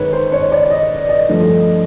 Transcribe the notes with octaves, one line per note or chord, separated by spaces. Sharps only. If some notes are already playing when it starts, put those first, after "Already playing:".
Already playing: G#2 D#3 G#3 B4 C#5
C5
C#5
D5
D#5
D#5
G2 D3 F3 A3